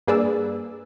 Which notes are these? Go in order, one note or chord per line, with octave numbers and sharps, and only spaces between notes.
G2 A#3 G#4 B4 D5 E6